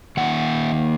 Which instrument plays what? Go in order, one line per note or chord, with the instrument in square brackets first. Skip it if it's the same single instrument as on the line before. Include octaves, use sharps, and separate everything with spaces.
[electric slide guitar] D#3 A#3 D#4 F#5